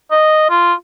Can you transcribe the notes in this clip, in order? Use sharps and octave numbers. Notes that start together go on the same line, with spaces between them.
D#5
F4